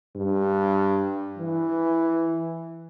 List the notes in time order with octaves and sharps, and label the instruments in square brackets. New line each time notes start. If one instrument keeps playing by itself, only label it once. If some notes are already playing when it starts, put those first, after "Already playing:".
[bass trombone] G2
E3